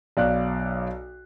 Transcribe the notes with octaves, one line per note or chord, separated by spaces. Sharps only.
B1 D5 F5 F#6